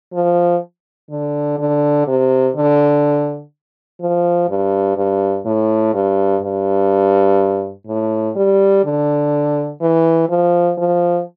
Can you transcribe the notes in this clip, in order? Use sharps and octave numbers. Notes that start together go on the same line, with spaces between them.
F3
D3
D3
C3
D3
F3
G2
G2
A2
G2
G2
A2
G3
D3
E3
F3
F3